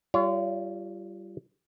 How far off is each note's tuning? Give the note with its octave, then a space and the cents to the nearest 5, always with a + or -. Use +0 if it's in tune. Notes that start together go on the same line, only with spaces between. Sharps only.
G3 -15 F4 -30 C#5 +25